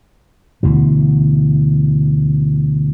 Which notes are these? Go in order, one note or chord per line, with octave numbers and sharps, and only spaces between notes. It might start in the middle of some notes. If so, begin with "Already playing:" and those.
D2 B2 E3